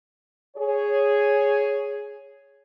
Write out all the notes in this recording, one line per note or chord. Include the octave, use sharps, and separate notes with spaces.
G#4 C#5